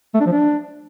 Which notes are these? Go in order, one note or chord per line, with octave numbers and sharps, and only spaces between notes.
A3
D4
F3
D4